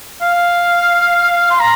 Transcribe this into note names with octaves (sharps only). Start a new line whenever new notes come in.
F5
C6
A#5